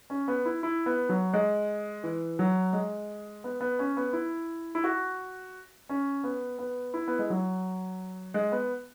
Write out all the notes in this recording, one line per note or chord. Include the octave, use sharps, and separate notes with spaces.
C#4
B3
E4
E4
B3
F#3
G#3
E3
F#3
G#3
B3
B3
C#4
B3
E4
E4
F#4
C#4
B3
B3
E4
B3
G#3
F#3
G#3
B3